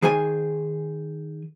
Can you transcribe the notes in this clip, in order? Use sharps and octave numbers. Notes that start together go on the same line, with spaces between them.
D#3 G#4 C5 G#5